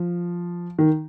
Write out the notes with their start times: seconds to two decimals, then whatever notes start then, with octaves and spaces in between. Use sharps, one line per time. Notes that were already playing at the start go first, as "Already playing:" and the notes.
Already playing: F3
0.79 D#3